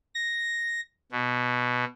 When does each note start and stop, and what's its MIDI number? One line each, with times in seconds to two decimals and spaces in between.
0.14 0.80 94
1.12 1.85 47